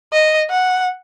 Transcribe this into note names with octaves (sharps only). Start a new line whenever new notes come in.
D#5
F#5